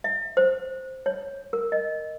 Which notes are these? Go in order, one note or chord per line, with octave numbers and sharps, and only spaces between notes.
E5
C5
C#5
A#4
D#5